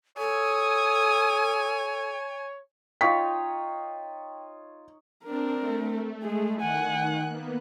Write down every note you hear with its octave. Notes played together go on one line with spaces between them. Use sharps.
A4 C#5 G#5 D#6
D#4 F4 C#5 G5 B6
C4 D4 A#4
A3
G#3 G#4
D#3 F#5 G#5 F#6
A#3 B3